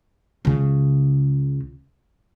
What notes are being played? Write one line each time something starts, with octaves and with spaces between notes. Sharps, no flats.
C#2 C#3